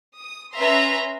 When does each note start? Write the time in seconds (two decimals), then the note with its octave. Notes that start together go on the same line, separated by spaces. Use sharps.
0.18 D#6
0.55 C#4 B4 E5 A#5 C6